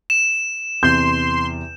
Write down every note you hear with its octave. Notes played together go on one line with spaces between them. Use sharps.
E7
E2 C3 C6 G6